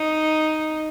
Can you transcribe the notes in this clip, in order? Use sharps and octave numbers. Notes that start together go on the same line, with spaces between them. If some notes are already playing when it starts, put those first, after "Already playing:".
Already playing: D#4